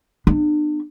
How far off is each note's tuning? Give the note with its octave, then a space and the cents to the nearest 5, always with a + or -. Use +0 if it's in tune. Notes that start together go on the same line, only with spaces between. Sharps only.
B3 +0 D4 +40